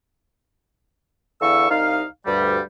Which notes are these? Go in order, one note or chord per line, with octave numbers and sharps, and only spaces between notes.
E2 D3 E3 F5 C#6 E6
C2 D#4 F5
D2 G2 G3